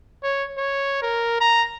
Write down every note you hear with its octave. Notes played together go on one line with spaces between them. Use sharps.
C#5
C#5
A#4
A#5